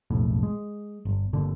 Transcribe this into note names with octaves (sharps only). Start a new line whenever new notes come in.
F#1 B1 F2 A2
G#3
G1
G1 A#2 D3